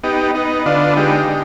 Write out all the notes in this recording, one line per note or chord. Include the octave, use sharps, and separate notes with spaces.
B3 D#4 G4
B3 D#4
D3 D4 F4
G#3 D#4 G4
D3